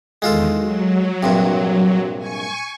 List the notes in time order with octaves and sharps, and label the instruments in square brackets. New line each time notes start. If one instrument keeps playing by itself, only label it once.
[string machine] E2 D#3 [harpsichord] G#3 F4 A4
[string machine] F#3
[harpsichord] A#1 G2 C3
[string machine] G#5 C#6